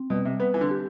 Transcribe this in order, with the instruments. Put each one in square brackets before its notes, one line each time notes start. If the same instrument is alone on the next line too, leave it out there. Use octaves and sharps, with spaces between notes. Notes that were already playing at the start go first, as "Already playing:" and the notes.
Already playing: [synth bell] C4
[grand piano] B2 [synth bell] G3
[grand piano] C3
[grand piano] B3 [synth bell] B4
[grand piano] E3
D3
[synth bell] G4